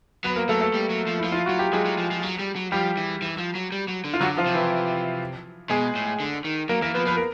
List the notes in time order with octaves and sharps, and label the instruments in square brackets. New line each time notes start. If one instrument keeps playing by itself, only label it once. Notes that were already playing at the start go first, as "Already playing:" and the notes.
[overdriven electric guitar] F#3 [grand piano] B3 B4
[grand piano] A#3 A#4
[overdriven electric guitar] F#3 [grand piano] A3 A4
[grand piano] A3 A4
[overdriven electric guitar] G3
F#3
F3
[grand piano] E4
[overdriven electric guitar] F3
[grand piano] F4
[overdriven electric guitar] F#3 [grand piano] F#4
[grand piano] G4
[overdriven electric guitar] F#3 [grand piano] G#3 G#4
[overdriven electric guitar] F#3
F3
F3
F#3
G3
F#3
[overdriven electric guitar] F3 [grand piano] G3 G4
[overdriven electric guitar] E3
E3
F3
F#3
G3
F#3
D3
[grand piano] F4
[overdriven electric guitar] D3 [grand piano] F#3 F#4
[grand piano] F3 F4
[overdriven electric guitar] C3
[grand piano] E3 E4
[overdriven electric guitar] B2 [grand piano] G#3 G#4
[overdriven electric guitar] A2
D3
D#3
[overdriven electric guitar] F#3 [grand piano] A#3 A#4
[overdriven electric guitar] E3 [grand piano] A#3 A#4
[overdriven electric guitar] F3 [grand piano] B3 B4
[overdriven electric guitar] F3 [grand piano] B4
[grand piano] A#4